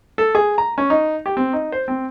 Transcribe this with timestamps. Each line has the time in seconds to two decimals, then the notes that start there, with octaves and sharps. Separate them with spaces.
0.18 A4
0.35 G#4
0.58 A#5
0.78 C#4
0.90 D#4
1.26 G4
1.37 C4
1.53 D#4
1.72 C5
1.88 C4